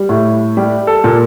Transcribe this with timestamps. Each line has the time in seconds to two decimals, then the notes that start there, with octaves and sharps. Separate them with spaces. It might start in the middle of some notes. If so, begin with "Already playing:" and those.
Already playing: G3
0.09 A2
0.57 G3 G4
0.87 A4
1.04 A#2